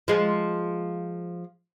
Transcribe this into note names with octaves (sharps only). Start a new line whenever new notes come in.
F3 G#3